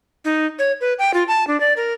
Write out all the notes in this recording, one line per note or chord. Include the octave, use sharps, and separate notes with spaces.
D#4
C#5
B4
G5
F4
A5
D4
D5
A#4